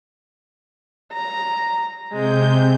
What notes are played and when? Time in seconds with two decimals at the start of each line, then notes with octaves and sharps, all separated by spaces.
1.13 A#5
2.12 C3 G#3 G6